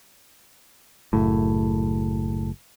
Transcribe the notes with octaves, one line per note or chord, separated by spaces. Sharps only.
F#1 A2